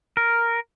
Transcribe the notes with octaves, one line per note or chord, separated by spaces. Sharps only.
A#4